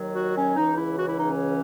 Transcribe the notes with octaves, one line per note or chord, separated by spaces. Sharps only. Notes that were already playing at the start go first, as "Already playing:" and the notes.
Already playing: D#2 D#3 F#3
F#4
C#4
C#2 C#3 E3 D#4
E4
F#4
E4
D#4
C#4